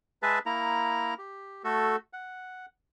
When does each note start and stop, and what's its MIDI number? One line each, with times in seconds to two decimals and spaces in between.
0.23 0.39 56
0.23 0.39 68
0.23 0.39 71
0.23 0.39 76
0.23 0.39 81
0.46 1.14 58
0.46 1.14 64
0.46 1.14 82
1.18 1.62 67
1.64 1.96 57
1.64 1.96 66
1.64 1.96 69
2.13 2.66 78